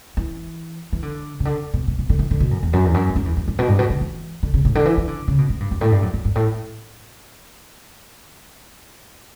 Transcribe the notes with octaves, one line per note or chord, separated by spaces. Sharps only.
E3
E3
D3
C#3
D3
B2
B2
B2
D3
E3
D3
B2
F#2
E2
F#2
E2
F#2
G2
F#2
E2
F#2
G2
B2
G2
B2
D3
E3
D3
C#3
A2
D3
E3
E3
D3
C#3
B2
A2
G2
F#2
A2
G2
F#2
F#2
G2
A2